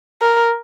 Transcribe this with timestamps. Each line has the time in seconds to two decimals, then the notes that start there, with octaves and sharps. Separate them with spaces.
0.21 A#4